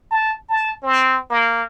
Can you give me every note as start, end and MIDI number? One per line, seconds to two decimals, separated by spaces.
0.11 0.34 81
0.49 0.76 81
0.82 1.19 60
1.30 1.62 58